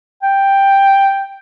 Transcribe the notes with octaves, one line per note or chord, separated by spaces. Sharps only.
G5